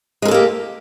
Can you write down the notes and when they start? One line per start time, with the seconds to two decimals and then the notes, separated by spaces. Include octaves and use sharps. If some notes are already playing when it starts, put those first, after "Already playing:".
0.22 G#3
0.25 A#4
0.28 A4
0.31 A#3
0.34 G4